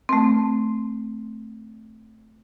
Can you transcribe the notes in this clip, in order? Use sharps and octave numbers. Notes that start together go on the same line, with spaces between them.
A3 C4